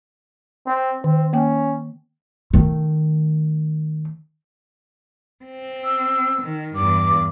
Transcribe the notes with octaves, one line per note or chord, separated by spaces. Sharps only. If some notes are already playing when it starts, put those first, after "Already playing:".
C4
D#3 C4
A#3 C#4 G5
D#3 A3
C4
E6
D#3
E2 G2 D6